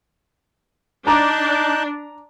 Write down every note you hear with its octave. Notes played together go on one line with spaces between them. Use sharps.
D4 D#4 A5 A#5 D6 F#6